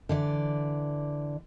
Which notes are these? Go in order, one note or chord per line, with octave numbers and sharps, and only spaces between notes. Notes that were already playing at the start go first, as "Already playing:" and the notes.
D3 E3 D5